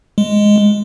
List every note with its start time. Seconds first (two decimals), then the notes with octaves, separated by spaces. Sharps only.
0.18 G#3